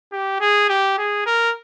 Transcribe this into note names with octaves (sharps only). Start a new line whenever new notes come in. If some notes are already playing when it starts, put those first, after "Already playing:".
G4
G#4
G4
G#4
A#4